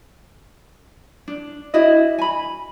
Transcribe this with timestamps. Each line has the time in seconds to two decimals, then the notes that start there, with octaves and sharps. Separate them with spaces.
1.28 D4
1.74 D4 E4 F#4 D#5
2.18 G#5 B5